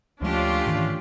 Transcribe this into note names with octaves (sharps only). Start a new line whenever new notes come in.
D2 F3 G#3 A3 C#4 D4 F4 G4
G#2 D#3 E3